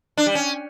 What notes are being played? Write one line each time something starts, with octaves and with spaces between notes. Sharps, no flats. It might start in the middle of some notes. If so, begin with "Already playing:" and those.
D4
G3
C#4